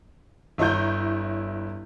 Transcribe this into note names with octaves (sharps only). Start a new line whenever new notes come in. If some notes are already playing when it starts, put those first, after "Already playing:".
G1 E4 C#5 A#5 C#6 G6